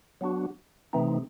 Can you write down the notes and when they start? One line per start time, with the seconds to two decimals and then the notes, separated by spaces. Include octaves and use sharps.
0.21 F#3 B3 D4 F#4
0.93 C3 E3 A3 C4 D#4